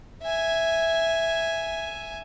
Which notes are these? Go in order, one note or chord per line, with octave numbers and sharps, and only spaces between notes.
E5 G#5